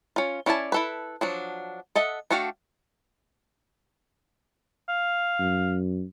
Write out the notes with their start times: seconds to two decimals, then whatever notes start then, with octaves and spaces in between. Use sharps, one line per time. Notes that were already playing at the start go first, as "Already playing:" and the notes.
0.16 C#4 F4
0.46 C#4 E4 D5 G#5 A5
0.72 E4 A4 B4
1.21 F3 F#3 D4
1.96 A4 D#5 E5 F#5
2.31 A3 D4 F#4 F5 G5
4.89 F5
5.39 F#2